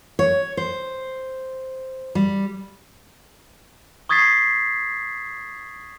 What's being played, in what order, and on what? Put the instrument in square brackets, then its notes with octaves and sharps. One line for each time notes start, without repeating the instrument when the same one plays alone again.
[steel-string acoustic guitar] C#5
C5
G3
[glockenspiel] C#6 D#6 G#6 A6 B6 C7